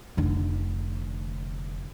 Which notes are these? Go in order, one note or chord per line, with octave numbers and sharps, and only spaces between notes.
F1 D3